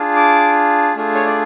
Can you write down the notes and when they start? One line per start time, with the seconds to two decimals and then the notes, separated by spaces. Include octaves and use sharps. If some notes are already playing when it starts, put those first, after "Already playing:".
Already playing: D4 F4 G#4
0.16 D6
0.95 A3 D4 F4 G#4
1.15 C#5
1.25 D5